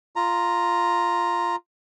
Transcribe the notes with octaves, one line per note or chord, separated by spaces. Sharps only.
F4 A#5